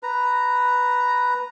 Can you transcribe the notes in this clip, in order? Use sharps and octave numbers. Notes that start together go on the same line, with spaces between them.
B4 A#5